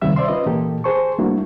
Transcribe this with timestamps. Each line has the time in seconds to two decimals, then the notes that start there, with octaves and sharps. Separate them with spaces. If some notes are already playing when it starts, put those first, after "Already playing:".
0.02 D2 C3 D#3 G3 E5 E6
0.16 C5 D5 E5 C6
0.28 C#4 F4 B4 D#5
0.46 A#2 E3 A#3 G4 A4
0.84 G#4 C5 A5 C#6
1.19 G3 A3 A#3 D4 E4 F#4